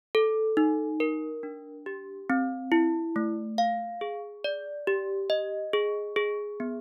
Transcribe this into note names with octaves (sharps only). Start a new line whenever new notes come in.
A4
D#4
A#4
D4
G4
C4
E4
A3
F5
G#4
D5
G4
D#5
G#4
G#4
B3